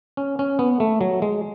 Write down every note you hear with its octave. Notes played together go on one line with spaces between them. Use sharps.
C#4
C#4
B3
A3
F#3
G#3